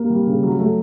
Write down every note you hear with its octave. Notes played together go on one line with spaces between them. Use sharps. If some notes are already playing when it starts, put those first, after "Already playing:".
Already playing: A#3
G3
C#3
F#3
A3